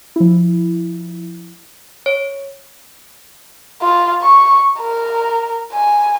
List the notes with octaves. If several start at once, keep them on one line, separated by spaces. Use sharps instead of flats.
F3 E4
C#5
F4
C#6
A#4
G#5